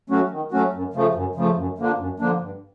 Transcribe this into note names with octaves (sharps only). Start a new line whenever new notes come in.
F#3 A3 C#4 F#4
D#3
F#3 A3 C#4 F#4
F#2
C#3 F3 A3
F#2
C#3 F3 A3
F#2
D3 F3 A#3 D4
F#2
D3 F3 A#3 D4
G2